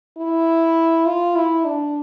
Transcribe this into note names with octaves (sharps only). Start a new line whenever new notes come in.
E4
F4
E4
D4